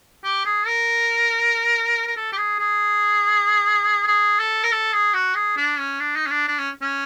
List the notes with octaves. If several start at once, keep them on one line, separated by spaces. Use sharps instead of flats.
G4
G#4
A#4
A#4
A4
G4
G#4
G#4
G#4
A4
A#4
A4
G#4
F#4
G#4
D4
C#4
D4
D#4
C#4
D4
D4
C#4
C#4